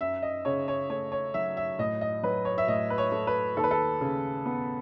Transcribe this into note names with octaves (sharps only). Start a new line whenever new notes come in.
F#2 E5
D#5
C#3 C#5
C#5
A3 C#5
C#5
F#3 E5
E5
A2 D#5
D#5
F#3 B4
C#5
E5
A2 D#5
B4
C#5
A3
B4
D#2 A4
B4
A4
C#3
B3